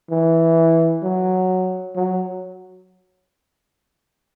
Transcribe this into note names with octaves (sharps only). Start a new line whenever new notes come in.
E3
F#3
F#3